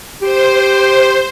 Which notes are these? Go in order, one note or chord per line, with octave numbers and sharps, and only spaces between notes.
G4 C5